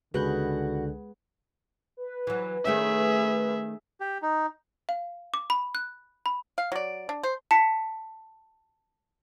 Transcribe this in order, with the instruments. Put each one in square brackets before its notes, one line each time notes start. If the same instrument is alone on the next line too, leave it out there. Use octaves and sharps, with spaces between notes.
[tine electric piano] C#2 F#6 G6 [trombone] D3 [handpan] G#3 G#4 B4 [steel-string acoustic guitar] F#4
[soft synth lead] B4
[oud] E3 F#3
[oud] D#3 A3 C#4 [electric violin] G#4 E5
[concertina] G4
D#4
[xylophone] F5
D6
B5
F#6
B5
[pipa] F5
F#3 D5
D4
C5
[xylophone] A5 B6 C#7